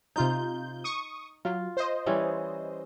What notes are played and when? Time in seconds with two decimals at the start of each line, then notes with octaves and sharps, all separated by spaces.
0.16 C3 D#4 F4 G6
0.84 C#6 D#6
1.45 F#3 F4
1.77 C5 D#5
2.06 E3 G3 C#4